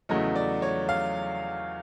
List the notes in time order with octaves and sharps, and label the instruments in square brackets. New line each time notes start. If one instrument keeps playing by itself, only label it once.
[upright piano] E2 C#3 F#3 A3 D#5
D5
C#5
F5